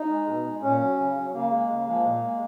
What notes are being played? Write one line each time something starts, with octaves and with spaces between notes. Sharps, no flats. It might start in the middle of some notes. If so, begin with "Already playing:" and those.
Already playing: D#4
G#3
B2
G#3
A#2 C#4
F#3
C#3
F#3
C#3 A#3
G#3
C#3
F3 G#3
A#2
G#3